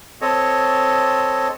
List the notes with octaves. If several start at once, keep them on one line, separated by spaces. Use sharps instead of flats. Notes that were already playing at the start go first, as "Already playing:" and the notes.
C4 A4 C#5 D#5